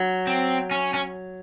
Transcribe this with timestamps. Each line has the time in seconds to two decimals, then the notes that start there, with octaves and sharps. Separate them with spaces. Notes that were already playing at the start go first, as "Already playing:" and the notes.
Already playing: F#3
0.27 C4
0.71 C#4
0.94 C#4